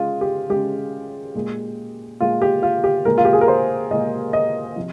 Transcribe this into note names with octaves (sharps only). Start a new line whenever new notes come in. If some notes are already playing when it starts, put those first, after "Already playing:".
Already playing: C#3 G#3 F4
G4
C#3 G#3 G4
A#2 G#3
A#2 G#3 F4
G4
F4
G4
A#2 G#3 A#4
F4
G4
G#4
A#4
C5
A#2 G#3 D#5
D#5
C3 F3